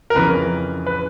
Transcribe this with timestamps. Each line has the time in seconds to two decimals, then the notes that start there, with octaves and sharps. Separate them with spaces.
0.10 A#4
0.15 F2 C#3 E3 B4
0.86 B4